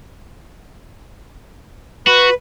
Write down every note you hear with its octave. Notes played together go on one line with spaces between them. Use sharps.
F#4 B4